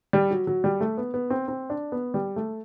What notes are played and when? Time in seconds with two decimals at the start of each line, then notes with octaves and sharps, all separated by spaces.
0.13 G3
0.31 F#3
0.47 F#3
0.64 G3
0.81 A3
0.98 B3
1.14 B3
1.30 C4
1.48 C4
1.70 D4
1.92 B3
2.14 G3
2.36 A3